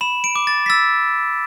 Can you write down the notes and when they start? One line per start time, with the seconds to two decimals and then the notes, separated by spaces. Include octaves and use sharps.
0.01 B5 E7
0.24 D7
0.36 D6
0.47 A6
0.66 B6
0.70 E6 A6